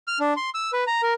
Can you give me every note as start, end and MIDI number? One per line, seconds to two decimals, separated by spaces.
0.07 0.19 89
0.20 0.34 62
0.37 0.50 84
0.55 0.71 88
0.73 0.84 71
0.87 1.01 82
1.03 1.14 70